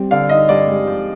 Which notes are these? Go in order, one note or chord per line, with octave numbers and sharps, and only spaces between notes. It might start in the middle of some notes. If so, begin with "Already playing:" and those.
Already playing: G3 C4
D3 F5
D#4 D#5
G2 D5
G#3
F3